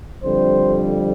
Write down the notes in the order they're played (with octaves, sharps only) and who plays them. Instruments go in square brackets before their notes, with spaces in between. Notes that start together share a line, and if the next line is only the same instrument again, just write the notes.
[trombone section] F2 D3 G3 C4 C5